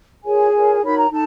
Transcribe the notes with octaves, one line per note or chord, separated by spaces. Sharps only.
F4 G#4 A#4 C#5 G#5
F4 A#4 C#5
D#4 F#4 A#4 C#5 B5
A#5
D#4 A4 A5